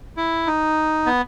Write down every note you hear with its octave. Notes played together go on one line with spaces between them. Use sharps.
E4
D#4
B3